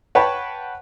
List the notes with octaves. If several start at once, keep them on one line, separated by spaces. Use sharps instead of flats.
B4 C#5 F#5 G5 A5